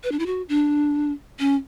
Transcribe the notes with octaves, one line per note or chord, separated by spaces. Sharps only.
B4
D4
E4
F#4
D4
C#4